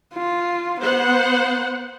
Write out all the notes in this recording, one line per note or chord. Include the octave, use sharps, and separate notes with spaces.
F4
B3 C5 F#5